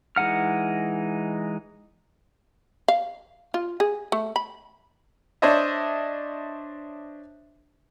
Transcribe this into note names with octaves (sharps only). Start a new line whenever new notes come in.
E3 G#3 D#4 F#5 F6
F5
F4
G#4
A3
B5
D4 C5 C#5 D#5 E5